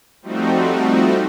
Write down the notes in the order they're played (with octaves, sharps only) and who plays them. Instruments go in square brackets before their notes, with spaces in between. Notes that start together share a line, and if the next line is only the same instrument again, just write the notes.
[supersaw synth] F3 G3 A3 C4 D#4 F#4